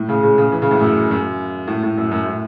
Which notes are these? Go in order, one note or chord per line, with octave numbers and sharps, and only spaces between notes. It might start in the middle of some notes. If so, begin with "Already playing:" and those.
Already playing: A2
C#3
C#3
C#3
E3
C#3
A2
F#2
F#2
A2
A2
F#2
F#2
A2